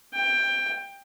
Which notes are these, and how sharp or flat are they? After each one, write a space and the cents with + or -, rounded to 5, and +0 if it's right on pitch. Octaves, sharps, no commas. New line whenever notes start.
G5 +20